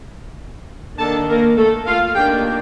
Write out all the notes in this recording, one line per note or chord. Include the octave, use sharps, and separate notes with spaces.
D#3 A#3 D4 A4 A5
A#3 A#4
A3 A4
F4 F5
D#3 A#3 D4 G4 G5